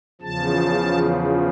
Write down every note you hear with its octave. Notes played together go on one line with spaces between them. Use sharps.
E2 C#3 F3 A5